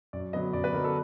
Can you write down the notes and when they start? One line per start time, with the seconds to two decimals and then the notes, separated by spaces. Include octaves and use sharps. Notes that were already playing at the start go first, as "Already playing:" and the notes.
0.13 F#2 D5
0.33 D3 F#3 B3 D#5
0.53 F#2 D5
0.64 B4
0.74 D3 F#3 B3 A#4
0.84 A4